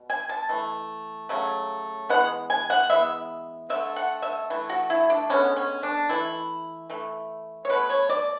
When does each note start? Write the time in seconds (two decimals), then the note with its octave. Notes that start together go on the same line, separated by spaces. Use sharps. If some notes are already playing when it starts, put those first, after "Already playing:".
Already playing: B2
0.10 G#5
0.29 A5
0.49 E3 A3
1.29 C#3 F#3 A3
2.09 E3 G#3 B3 F#5
2.50 G#5
2.70 F#5
2.90 E3 G#3 B3 E5
3.70 D3 A3 E5
3.96 F#5
4.22 E5
4.50 E3 A3
4.69 F#4
4.90 E4
5.10 D4
5.30 D3 G#3 B3 C#4
5.56 C#4
5.83 D4
6.09 E3 A3 E4
6.90 E3 A3
7.65 C#5
7.70 B2 A3 B4
7.90 C#5
8.09 D5